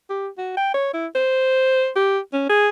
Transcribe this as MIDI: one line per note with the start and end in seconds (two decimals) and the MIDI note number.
0.10 0.28 67
0.38 0.52 66
0.57 0.72 79
0.74 0.90 73
0.93 1.07 64
1.15 1.90 72
1.96 2.19 67
2.33 2.48 61
2.49 2.69 68